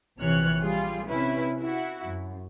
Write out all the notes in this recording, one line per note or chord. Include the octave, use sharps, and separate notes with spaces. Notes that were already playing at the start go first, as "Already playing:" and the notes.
A#1 C3 E3 C#5 F6 F#6
G3 F4 G#4
C3 C#4 E4 B4
E4 F#4
F#2